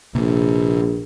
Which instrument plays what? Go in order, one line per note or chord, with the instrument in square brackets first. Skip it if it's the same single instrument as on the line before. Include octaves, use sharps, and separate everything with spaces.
[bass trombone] A#1 [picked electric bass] C3 A#3